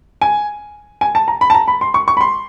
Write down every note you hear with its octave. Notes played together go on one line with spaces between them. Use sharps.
G#5
G#5
A5
A#5
B5
A5
A#5
B5
C6
C#6
C#6
B5
C6